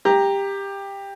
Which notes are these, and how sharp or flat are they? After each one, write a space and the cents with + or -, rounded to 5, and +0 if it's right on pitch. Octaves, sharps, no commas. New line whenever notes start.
G4 +15 A#5 +0